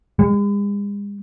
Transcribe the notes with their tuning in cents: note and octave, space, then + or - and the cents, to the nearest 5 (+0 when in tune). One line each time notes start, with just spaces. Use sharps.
G#3 -45